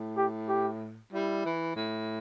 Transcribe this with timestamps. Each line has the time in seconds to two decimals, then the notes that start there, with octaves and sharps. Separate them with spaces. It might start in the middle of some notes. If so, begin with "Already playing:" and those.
Already playing: A2
0.17 G4
0.49 G4
1.13 G3 E4
1.45 E3
1.76 A2